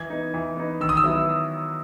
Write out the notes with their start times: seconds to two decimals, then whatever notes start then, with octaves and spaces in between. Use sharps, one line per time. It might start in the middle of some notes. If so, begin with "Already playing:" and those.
Already playing: E3 G#6
0.10 B3 D#4
0.34 E3
0.57 B3 D#4
0.80 D#3 E6
0.89 D#6
0.97 E6
1.04 F#3 B3 E4